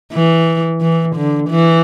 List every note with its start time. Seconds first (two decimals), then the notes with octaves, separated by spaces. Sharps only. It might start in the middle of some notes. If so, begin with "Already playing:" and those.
0.13 E3
0.81 E3
1.16 D3
1.49 E3